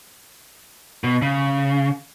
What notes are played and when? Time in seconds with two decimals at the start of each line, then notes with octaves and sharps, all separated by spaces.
1.04 B2
1.22 C#3